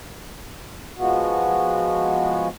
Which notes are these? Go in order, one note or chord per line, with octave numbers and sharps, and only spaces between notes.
F3 G#3 B3 F#4